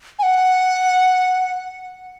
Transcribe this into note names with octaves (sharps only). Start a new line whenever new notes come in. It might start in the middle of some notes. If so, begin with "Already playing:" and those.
G#5
F#5